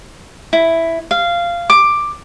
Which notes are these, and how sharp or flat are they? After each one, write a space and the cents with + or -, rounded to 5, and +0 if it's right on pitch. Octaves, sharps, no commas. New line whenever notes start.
E4 +0
F5 -15
D6 +10